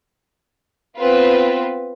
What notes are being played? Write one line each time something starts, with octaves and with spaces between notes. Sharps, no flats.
B3 C4 F4 B4